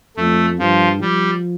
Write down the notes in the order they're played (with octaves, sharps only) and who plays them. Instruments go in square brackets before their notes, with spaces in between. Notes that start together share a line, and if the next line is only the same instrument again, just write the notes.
[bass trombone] F2 [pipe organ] A3
[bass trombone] G2 [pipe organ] F3
[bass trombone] F3 [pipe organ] G3